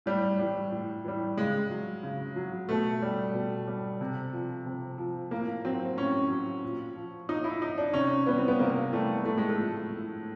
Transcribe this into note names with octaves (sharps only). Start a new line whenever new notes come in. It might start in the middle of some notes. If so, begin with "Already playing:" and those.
A2 G3
E3 G3
A2
E3 G3
C#3 G#3
F#3
C#3
F#3
B2 A3
G3
B2
G3
C3
F3
C3
F3
A2 A#3
F#3 C4
A2 C#4
F#3
A#2
F3
A#2 D#4
E4
F3 D#4
D4
C3 C#4
E3 G3 B3
C4
B3
C3 A#3
E3 G3 A3
A2 A3
G#3
A3
F3
A2